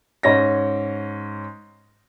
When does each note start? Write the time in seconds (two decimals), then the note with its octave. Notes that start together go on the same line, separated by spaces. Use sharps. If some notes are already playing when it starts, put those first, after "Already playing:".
0.23 G#2 C#4 A#6